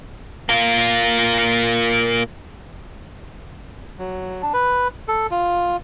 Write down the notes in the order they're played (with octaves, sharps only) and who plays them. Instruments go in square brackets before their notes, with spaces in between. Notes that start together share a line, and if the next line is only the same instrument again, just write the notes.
[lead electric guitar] A#3 F4
[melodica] F#3
D4
B4
A4
F4